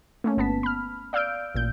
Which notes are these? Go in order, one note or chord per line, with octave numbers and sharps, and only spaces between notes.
A3 A#3 C#4
G1 B3 A5 B6
B5 F6
D5 F5 E6 F6 G6 D7
A1 A#2 G6